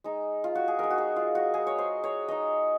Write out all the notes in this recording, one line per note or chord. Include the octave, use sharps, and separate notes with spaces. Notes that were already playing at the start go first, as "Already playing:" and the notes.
G#3 D#4
F4
F#4
G#4
G#3 D#4 A#4
F#4
G#4
F4
F#4
G#3 D#4 G#4
C#5
C5
C#5
G#3 D#4 D#5